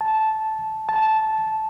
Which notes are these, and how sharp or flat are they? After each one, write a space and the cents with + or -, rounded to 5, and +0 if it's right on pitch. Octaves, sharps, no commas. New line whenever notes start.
A5 -10
A5 -10